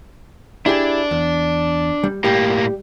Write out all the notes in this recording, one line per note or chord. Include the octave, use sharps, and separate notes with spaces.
D4 E4 G4 G#4
E2
G3
A2 G3 A#3 G4